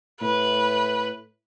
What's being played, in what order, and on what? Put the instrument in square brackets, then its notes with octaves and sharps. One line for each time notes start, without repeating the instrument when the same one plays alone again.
[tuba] A2 [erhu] B4